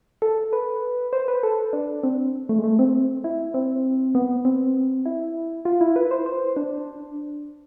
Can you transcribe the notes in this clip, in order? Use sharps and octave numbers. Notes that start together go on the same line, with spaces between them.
A4
B4
C5
B4
A4
D4
C4
A3
G#3
A3
C4
E4
C4
B3
C4
E4
F4
E4
B4
C5
C5
D4